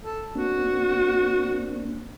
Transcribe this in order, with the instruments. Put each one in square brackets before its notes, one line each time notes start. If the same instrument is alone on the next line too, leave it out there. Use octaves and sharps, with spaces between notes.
[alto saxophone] A4
[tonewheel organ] A#3 C4 D4 [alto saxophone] F#4